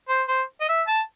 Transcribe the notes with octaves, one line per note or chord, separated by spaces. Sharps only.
C5
C5
D#5
E5
A5